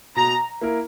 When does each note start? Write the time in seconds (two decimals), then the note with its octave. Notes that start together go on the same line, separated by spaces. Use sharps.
0.16 B2 A#5
0.61 A#3 E4 A#4